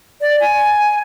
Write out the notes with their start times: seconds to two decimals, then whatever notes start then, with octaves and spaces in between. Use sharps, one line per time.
0.21 D5
0.40 G#5